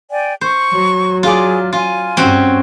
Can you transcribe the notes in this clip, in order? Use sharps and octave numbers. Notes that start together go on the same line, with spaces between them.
D5 G5 G#5
C5 C#6
F#3
F4 G#4 D5
F4 G#5
G2 C4 C#4 F#4